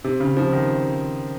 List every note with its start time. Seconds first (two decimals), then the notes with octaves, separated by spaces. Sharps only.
0.04 C3
0.20 C#3
0.37 F3
0.53 D#3